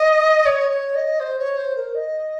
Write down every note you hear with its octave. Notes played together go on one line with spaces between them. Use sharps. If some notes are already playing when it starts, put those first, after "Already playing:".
Already playing: D#5
C#5
C#5
D#5
C5
C#5
C5
A#4
D#5